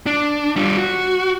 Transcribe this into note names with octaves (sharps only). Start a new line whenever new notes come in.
D4
G3 F4
F#4